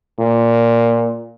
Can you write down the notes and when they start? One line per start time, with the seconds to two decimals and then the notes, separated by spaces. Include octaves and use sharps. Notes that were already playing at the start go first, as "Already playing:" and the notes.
0.19 A#2